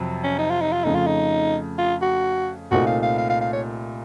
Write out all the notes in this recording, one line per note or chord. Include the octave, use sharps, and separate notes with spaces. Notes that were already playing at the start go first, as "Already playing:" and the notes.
Already playing: F2 C3 F#3
C#4
D#4
F4
D#4
F4
F2 C#3 A3 D#4
F4
D#4
F4
F#4
C2 A#2 A3 C4 D#4 F#4
F5
F5
F5
F5
F5
C#5